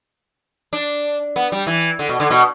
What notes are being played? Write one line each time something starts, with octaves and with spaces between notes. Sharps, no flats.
D4
B3
G3
E3
D3
B2
D3
B2